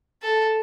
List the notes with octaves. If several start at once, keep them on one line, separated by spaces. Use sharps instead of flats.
A4